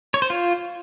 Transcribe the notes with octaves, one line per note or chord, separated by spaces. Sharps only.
C#5
C5
F4